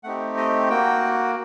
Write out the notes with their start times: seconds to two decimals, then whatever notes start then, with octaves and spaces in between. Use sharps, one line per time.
0.04 A3 C4 D#4 G4 F#5
0.37 D#5
0.70 A#3 F#4 G5